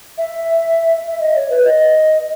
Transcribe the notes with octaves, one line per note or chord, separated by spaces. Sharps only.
E5
E5
D#5
C#5
B4
D#5